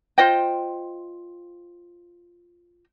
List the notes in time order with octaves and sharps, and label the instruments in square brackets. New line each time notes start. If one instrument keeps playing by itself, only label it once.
[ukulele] F4 C5 D#5 G5